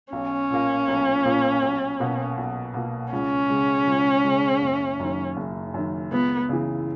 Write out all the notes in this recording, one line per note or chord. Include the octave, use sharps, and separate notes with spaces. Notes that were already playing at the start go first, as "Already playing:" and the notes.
B1 C#4
A#2 A#3
B1
A#2 A#3
B1
B2 A#3
B1
B2 A#3
C#2 C#4
C#3 G#3
C#2
C#3 G#3
F#1
F#2 D#3
F#1
F#2 D#3
C#2 B3
C#3 E3